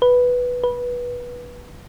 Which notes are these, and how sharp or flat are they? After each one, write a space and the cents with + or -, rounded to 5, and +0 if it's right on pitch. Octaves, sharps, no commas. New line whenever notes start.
B4 +0
B4 -15